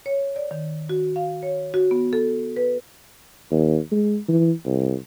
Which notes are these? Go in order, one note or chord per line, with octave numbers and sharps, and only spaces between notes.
C#5
D5
D#3
F#4
F5
C#5
F#4
B3
A4
B4
D#2
G#3
E3
C2